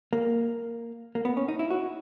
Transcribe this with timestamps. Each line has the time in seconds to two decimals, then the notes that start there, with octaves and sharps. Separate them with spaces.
0.13 A#3
1.15 A#3
1.25 B3
1.37 C#4
1.48 D#4
1.59 E4
1.71 F#4